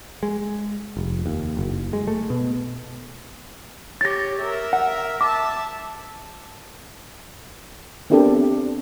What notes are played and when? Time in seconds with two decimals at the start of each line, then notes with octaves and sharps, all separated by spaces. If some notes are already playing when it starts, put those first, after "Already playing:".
0.23 G#3
0.97 F1
1.26 D#2
1.57 F#1
1.93 G#3
2.07 A3
2.30 B2
4.01 G4 C#5 A6 A#6
4.39 A#4 E5
4.73 F#5
5.21 E5 A5 D6
8.10 B3 C4 D4 G4 A4 A#4